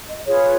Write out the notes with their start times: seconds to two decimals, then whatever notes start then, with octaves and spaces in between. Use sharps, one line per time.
0.10 D#5
0.26 F4 G#4 B4 C#5